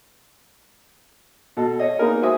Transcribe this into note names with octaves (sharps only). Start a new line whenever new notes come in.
B2 A4
C#5 D#5
A#3 B3 D#4 G#4 A#4
F#4 C5 E5 G#5 D#6